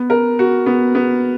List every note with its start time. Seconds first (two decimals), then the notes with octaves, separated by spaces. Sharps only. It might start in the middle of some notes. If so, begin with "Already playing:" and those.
Already playing: B3
0.10 A#4
0.39 F#4
0.66 B3
0.95 B3